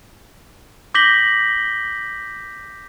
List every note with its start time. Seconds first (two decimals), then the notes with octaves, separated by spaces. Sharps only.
0.94 D6 G6 A#6 B6 F#7 G7